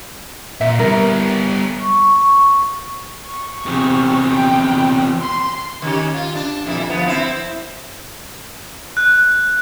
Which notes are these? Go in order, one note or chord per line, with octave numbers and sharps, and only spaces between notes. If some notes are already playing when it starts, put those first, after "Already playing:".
A#2 E5
G3 B3 E4 A#4
C#6
C#6
E2 C3
G5
C6
D#3 C#4 G4
F4
D4
F2 A#2 E4
F3 B3
C4 E4
F#6